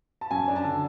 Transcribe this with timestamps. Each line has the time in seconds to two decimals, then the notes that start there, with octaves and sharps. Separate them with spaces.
0.21 A5
0.31 F#2 G#5
0.48 D4
0.56 A5
0.64 D3